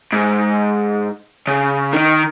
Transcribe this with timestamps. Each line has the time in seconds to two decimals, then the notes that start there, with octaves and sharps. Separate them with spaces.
0.12 G#2
1.48 C#3
1.93 D#3